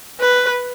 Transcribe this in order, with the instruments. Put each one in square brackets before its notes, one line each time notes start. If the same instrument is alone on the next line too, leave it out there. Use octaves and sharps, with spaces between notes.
[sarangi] B4